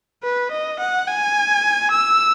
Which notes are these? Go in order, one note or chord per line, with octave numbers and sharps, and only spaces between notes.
B4
D#5
F#5
G#5
E6